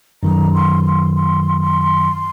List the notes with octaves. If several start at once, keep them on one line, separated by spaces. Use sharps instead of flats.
F#2 D#3 F#3 A#5
C6
C6
C6
C6